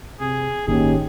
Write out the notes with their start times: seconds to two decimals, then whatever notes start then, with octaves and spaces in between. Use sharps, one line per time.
0.20 C3 G#4
0.68 G1 A2 D#3 A#3 C#4 D#4 G4 G#4